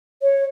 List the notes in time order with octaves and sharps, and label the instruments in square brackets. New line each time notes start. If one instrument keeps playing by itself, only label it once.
[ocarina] C#5